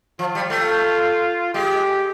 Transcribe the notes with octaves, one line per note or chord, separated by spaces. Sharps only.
F3 F4
G3
A3
G#3 G4